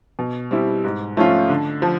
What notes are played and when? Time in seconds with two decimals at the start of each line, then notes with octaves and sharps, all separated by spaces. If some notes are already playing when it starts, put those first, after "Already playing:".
0.19 B2
0.51 G3 C4 E4 G4
0.84 G#2
1.17 F3 A3 C#4 F4
1.50 D3
1.82 F3